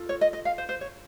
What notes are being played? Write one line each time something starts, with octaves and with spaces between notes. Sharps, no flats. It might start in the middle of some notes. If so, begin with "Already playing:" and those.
Already playing: F4 A4
C#5
D#5
D#5
F5
C5
C5
C#5